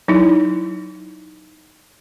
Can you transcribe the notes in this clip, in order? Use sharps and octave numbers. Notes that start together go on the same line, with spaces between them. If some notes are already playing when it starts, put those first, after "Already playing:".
F#3 D#4 E4